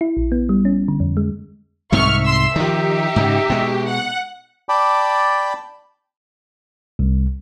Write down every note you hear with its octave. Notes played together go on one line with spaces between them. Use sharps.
E4
A#1
B3
G3
C#4
D3
F2
G#3
C2 G#2 C3 E5 C#6 F6
C6 E6
D#3 F3 D#4 G4
G#2 C#3
B2 G#3
F#5
D5 G5 A5 B5 D6
C2